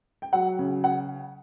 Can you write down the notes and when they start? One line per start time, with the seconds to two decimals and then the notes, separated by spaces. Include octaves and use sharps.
0.22 G5
0.33 F#3 F#5
0.59 C#3
0.84 F#5